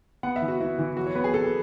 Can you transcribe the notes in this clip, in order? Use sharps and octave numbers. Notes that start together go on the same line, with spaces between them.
B3 F#5
E5
E3
F#4
B3 E4
E3
F#3 F#4
C#5
B3 B4
G#4
B3 A4